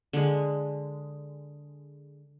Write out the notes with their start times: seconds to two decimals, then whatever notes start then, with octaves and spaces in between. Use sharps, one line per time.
0.13 D3 G#3